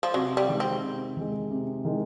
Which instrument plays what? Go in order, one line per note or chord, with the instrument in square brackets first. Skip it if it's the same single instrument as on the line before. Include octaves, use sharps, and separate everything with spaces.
[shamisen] F3
[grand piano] C3 [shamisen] F#3
[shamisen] G3
[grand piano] D#3 G#3
[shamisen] C4
[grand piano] C3
D#3 G#3
C3
D#3 G#3